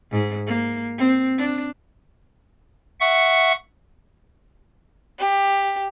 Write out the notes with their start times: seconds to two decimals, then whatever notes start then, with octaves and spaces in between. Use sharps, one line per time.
0.11 G#2
0.47 A#3
0.98 C4
1.38 D4
3.00 E5 F#5 C#6
5.19 G4